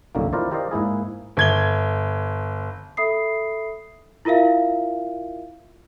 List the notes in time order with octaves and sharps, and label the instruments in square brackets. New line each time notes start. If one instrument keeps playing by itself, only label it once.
[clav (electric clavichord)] C2 F#2 D3 D#3 A3 A#3
D#3 E4 F4 A#4 C5 D5
G4 A#4 C5 D5 D#5 F5
G#2 A#3 E4 G#4
[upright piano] G1 G#6 G7
[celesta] A4 E5 B5 D#6 C7
E4 F4 A#4 E5 F5